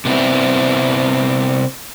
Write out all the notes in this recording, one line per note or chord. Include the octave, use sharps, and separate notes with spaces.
C3 B3 C4 E4